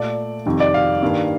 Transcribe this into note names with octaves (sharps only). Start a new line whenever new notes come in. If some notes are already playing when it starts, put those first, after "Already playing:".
Already playing: A#2 A3 D5
F2 C3 D#3 G3
D5
F5
G2 D#3 G3 A#3